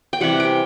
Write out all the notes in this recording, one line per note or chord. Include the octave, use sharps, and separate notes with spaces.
G5
C3 E3 G3 F#5
G5